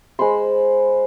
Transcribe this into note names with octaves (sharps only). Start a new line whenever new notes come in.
G#3 C5 B5 C6